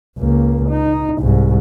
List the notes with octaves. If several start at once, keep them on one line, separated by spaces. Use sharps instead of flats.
C#2 A#3
D#4
C2 G#2